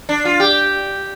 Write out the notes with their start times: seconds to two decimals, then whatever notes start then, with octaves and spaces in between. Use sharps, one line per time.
0.09 D4
0.25 F4
0.40 G4